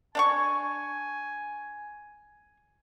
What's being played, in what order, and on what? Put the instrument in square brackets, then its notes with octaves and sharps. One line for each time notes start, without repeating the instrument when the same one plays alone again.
[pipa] D4 F5 C#6 [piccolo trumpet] G#5